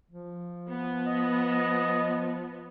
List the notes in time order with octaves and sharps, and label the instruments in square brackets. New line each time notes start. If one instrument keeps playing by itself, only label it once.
[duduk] F3
[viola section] B3
[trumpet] D#5